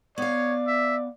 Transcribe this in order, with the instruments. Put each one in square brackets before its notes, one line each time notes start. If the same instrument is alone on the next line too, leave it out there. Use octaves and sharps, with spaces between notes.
[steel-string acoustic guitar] B3 F5 [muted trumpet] C#5 [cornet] D5
[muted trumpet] E5